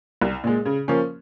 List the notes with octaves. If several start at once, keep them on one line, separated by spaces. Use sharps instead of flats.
C2
A#2 G#3
C#3
F3 A#3 C#4